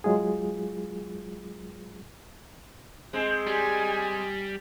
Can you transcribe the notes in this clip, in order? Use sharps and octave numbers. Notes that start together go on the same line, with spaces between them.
F#3 G#3 F4 G#4
G#3 C4
G3 G#5